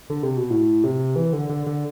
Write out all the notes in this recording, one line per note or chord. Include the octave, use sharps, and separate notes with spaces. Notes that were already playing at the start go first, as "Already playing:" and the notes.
D3
C3
B2
A2
C3
E3
D3
D3
D3